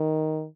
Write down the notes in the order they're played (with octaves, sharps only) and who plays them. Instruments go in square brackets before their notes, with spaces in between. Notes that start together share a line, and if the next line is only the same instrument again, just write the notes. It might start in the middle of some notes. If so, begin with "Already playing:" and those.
Already playing: [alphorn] D#3